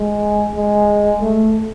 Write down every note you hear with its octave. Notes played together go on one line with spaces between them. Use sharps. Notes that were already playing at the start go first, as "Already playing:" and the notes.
Already playing: G#3
G#3
A3